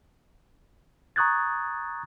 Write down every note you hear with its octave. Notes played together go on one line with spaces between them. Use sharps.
A#5 C#6 D#6 F#6 G#6 A6